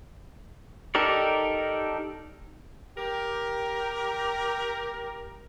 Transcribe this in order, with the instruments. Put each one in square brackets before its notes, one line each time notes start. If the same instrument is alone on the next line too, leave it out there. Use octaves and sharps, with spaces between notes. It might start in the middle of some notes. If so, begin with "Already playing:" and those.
[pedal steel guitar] D#4 G4 A4 A#4 D5
[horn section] G4 A#4